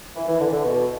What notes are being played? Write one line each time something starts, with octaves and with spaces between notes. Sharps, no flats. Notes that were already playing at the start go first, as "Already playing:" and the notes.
E3
E3
D3
E3
D3
B2